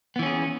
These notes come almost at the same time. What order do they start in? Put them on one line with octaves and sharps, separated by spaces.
B3 E3 C#4 G#4